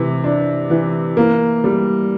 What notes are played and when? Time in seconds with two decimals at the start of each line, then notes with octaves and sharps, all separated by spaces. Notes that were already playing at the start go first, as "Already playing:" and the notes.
Already playing: C3 E3
0.24 D4
0.70 E3
1.17 A#3
1.64 G3